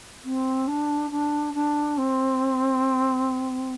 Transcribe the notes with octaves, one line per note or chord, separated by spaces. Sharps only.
C4
D4
D4
D4
C4